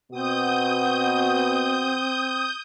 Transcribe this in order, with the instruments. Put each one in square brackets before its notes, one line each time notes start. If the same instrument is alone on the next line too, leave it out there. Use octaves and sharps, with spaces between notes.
[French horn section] B2 F#4 [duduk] C4 [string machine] D#6 G6